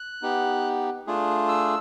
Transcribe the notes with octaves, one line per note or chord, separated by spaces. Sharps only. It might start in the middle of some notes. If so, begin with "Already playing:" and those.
Already playing: F#6
B3 D#4 G4
A3 D4 F4 G#4
E6